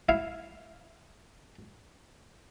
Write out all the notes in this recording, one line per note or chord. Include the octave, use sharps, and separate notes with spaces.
E4 F5